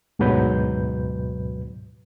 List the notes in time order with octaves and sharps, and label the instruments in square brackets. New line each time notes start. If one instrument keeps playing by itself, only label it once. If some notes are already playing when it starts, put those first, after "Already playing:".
[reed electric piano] D2 G#2 B2 F#3 B4 G6